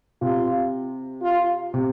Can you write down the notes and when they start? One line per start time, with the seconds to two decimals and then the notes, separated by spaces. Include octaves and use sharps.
0.21 C3 F4
1.23 F4
1.74 C3